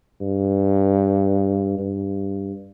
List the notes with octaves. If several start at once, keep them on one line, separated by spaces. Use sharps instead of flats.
G2
G2